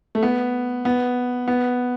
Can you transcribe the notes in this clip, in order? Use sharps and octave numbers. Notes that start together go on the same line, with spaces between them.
A3
B3
B3
B3